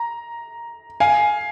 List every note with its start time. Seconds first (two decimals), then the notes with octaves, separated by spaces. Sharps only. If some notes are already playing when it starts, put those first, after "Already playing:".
Already playing: A#5
1.00 F5 G#5